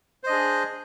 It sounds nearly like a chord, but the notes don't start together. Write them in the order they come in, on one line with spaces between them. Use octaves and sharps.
C5 D#5 D4 G#4